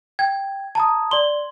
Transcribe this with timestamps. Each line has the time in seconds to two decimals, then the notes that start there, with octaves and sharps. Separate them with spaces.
0.19 G5 G#6
0.75 A5 A#5 D#6
1.11 D5 C6 G7